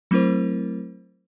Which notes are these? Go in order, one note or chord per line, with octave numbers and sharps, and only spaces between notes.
F#3 A3 C4 E4 A#4 C5